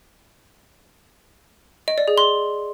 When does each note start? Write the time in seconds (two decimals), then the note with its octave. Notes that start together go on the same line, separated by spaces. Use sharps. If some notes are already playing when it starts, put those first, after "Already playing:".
1.88 D#5
1.98 D5
2.08 G#4
2.18 C6